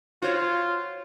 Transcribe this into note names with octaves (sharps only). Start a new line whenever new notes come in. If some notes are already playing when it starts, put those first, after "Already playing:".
F4 F#4 C5 C#5